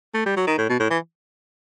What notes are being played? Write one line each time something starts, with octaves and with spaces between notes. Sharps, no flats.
A3
G3
F#3
D#3
A2
B2
A2
E3